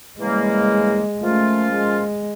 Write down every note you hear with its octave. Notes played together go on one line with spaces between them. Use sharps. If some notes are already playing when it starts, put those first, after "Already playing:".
C#3 E3 G3 G#3 A#3
F3 A3 A#3 C#4 F4
G#3